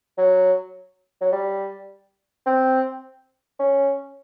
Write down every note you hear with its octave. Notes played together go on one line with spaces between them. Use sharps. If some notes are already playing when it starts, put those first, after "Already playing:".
F#3
F#3
G3
C4
C#4